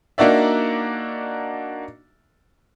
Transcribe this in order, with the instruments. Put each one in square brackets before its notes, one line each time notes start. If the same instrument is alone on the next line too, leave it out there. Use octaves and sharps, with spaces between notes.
[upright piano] A#3 D4 D#4 F#4 D5 E5